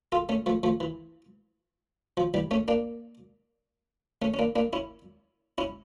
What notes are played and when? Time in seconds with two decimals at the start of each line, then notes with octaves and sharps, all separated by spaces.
0.12 F4 A4
0.29 A3 C#4
0.46 F3 A3
0.63 F3 A3
0.80 E3
2.17 F3
2.34 E3 G3
2.51 A3 C#4
2.68 A#3 D4
4.22 A3 C#4
4.34 C#4
4.39 A#3 D4
4.56 A#3 D4
4.73 C#4 E4
5.58 C#4 E4